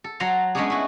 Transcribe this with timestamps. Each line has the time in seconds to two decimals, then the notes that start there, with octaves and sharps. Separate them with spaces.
0.04 A4
0.20 F#3 F#5 A5 A#5 C6
0.55 G#3 A3 B3 C#4 D4 G#4
0.70 E4 F#4